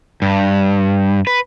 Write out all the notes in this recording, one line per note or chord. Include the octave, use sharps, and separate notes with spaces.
G2
B4